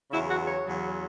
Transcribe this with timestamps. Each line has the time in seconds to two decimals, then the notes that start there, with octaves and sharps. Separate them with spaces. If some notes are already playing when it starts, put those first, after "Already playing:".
0.10 E2 C#3 F#3 E4
0.28 F#4
0.45 C#5
0.63 E2 C#3 F#3